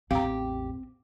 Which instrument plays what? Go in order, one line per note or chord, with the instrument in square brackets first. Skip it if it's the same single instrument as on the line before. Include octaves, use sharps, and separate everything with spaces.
[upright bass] A1 E2 [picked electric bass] C4 [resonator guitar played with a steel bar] G4 [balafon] F5 A#5